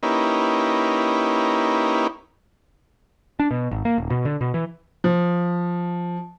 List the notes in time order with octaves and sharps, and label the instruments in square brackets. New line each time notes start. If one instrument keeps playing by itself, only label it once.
[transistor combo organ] A#3 C#4 D#4 E4 G4 B4
[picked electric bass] D4
B2
G#1
A#3
D#1
B2
D3
B2
E3
[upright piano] F3